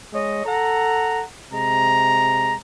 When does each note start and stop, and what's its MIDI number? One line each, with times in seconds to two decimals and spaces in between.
0.13 0.40 56
0.13 0.40 73
0.13 0.40 75
0.45 1.22 69
0.45 1.22 78
0.45 1.22 82
1.52 2.54 48
1.52 2.54 56
1.52 2.54 82